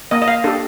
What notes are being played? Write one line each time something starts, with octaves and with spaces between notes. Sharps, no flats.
A#3 D#5
D#5
F5
D4 G4 A4